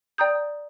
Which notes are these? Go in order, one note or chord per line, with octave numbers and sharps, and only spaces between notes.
D5 G5 A#5 D#6 G6